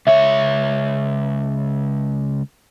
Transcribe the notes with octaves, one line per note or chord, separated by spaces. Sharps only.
C#2 C#5 E5